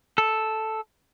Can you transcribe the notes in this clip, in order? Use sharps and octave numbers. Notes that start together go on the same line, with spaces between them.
A4